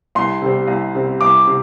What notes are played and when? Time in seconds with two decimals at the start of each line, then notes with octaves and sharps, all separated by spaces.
0.15 C2 C6
0.42 C3 G3 C4
0.68 C2
0.95 C3 G3 C4
1.21 C2 D6
1.47 C3